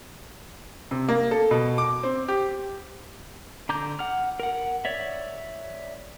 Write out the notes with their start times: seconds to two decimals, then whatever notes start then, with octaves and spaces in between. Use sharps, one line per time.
0.91 C3
1.09 A#3
1.31 A4
1.51 B2
1.78 D6
2.03 C4
2.28 G4
3.69 D3 A#5 D6 G6
3.99 F#5 F6
4.40 A#4 F#5
4.85 C#5 D5 E5